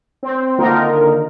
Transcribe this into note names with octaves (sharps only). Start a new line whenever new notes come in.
C4
D3 D#3 A#3 D#4 F4 A#4